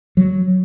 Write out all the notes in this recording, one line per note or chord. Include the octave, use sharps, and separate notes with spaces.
F#3